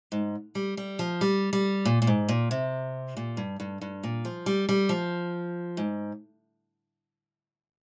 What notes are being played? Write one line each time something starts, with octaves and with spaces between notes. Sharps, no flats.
G#2
G3
G3
F3
G3
G3
A#2
A#2
G#2
A#2
C3
A#2
G2
G2
G2
A#2
F3
G3
G3
F3
G#2